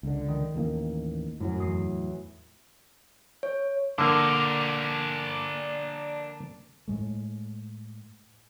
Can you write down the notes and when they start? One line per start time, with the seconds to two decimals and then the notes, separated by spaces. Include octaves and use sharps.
0.03 C#2 D3
0.28 D#3
0.55 A1 D#2 A#3
1.40 F#2 A2 F#3
1.60 E2 D#6 C7
3.43 C#5
3.98 D3 A#3 D4 A#4
6.88 A2 G#3 A3